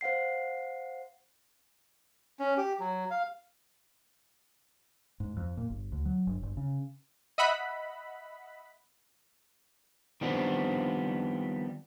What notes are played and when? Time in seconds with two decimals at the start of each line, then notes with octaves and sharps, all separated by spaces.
0.01 C5 F5 F#5 C7
2.40 C#4
2.57 G4
2.80 F#3
3.11 F5
5.20 G#2
5.37 F2
5.57 A#2
5.70 G1
5.92 D2
6.05 F#3
6.27 G1
6.43 G1
6.57 C#3
7.38 D#5 E5 F#5 B5
10.21 D#3 F3 G3 B3 C4 D4